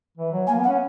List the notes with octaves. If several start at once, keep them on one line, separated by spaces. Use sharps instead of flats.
E3
F#3
A#3 G#5
B3
F#5
C#4